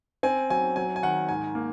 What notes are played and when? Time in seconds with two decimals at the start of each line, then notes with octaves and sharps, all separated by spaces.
0.23 C4 G#5
0.50 F#3 G#5
0.76 F#3 G#5
0.96 G#5
1.03 D#3 F#5
1.29 G#2 G#5
1.55 A#3